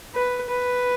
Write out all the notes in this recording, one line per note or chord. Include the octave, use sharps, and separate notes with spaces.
B4
B4